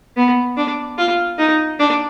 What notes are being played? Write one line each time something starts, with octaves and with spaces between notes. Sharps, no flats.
B3
D4
F4
D#4
D4